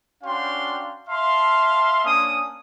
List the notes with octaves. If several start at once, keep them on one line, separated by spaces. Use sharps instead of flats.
C#4 D4 F#4 F5 G5 C6
E5 F5 A5 C6
A#3 C#4 D4 D#6